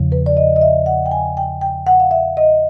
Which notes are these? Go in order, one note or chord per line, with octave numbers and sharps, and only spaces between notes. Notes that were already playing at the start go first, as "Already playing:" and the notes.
Already playing: E2 C#3 F3
B4
D5
D#5
D#5
E5
F#5
G5
G#5
G5
G5
F#5
F5
E5
D#5